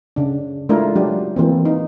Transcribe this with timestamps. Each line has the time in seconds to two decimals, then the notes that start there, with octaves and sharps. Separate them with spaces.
0.16 C#3 D4
0.69 G#3 A3 D4 E4 F4 A#4
0.96 F#3 D4 G4
1.36 E3 A#3 C4
1.65 D#4